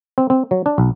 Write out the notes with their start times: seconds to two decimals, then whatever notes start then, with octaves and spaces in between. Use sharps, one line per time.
0.18 C4
0.30 C4
0.51 F#3
0.66 D4
0.78 B1